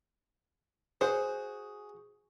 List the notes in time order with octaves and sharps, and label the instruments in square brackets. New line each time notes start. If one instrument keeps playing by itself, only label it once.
[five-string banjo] F#4 C5 [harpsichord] G#4